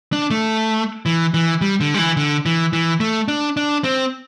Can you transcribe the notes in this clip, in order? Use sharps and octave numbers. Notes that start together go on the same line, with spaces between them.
D4
A3
E3
E3
G3
D3
G3
E3
D3
E3
E3
A3
D4
D4
C4